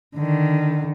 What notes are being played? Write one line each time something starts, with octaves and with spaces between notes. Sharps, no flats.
D3 D#3